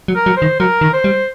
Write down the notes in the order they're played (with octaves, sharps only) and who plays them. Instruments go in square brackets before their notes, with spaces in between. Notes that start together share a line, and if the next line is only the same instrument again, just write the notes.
[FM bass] F#3
[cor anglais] A#4
[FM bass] F#3
[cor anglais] C5
[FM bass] D#3
[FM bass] F#3 [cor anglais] A#4
[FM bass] D#3
[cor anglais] C5
[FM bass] G3